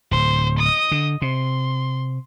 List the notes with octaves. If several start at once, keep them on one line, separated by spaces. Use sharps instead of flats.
D1 C5
D#5 D#6
D3
C3 C6